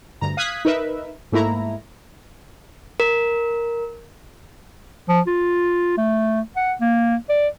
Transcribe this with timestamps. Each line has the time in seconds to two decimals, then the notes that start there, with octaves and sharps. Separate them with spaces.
0.21 D2 G2 A#5
0.37 F5 D#6 F#6 G#6 B6
0.65 D#4 A#4 B4 E5
1.32 G#2 A3 A#3 E4 A#5
3.00 A#4
5.08 F3
5.27 F4
5.97 A3
6.56 F#5
6.80 A#3
7.29 D5